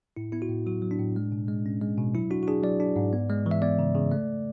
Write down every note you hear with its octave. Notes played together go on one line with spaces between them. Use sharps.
A2 E4
B3 E4
F#4
A2
F#3 F#4
F#3
D4
A2
G#3
B2
G#3
C#4
G#3
B2
F#3 E4
D4 F#4
F#4
D4 G#4
F#3 D5
D4
G#2
B3
G#3
E3
E5
B3 D5
C#3
C#3
A3